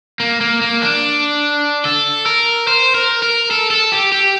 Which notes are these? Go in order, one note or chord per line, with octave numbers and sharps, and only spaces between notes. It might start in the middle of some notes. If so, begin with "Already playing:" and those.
A#3
A#3
A#3
D4
A4
A#4
C5
A#4
A#4
A4
A4
G4
G4